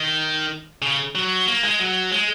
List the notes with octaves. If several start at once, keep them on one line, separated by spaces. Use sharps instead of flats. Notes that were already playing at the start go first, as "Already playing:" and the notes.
Already playing: D#3
C#3
F#3
A#3
G#3
F#3
G#3